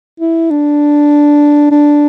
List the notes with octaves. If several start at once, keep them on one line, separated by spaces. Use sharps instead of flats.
E4
D4
D4